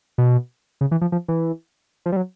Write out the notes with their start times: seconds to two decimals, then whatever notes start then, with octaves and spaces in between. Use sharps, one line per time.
0.18 B2
0.81 C#3
0.91 E3
1.01 F3
1.12 F3
1.28 E3
2.06 F3
2.12 G3
2.16 F#3